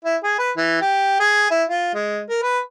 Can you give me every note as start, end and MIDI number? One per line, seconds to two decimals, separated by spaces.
0.05 0.16 64
0.24 0.35 68
0.39 0.51 71
0.57 0.80 52
0.81 1.19 67
1.20 1.50 68
1.51 1.64 64
1.70 1.89 65
1.94 2.22 56
2.29 2.38 70
2.43 2.59 71